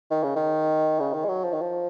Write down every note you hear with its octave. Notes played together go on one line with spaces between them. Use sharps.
D#3
C#3
D#3
C#3
D#3
G#3
F#3
F3
D#3
F3